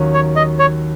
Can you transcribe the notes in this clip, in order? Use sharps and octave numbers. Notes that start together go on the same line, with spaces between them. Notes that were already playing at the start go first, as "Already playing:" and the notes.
Already playing: D#2 D#3 F#3 C#4
C#5
D#5
C#5